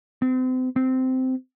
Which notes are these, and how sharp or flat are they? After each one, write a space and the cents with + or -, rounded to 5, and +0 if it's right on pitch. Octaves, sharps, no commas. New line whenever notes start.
C4 -35
C4 -15